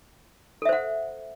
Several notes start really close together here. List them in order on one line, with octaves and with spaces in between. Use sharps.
A4 E5 C5 F#5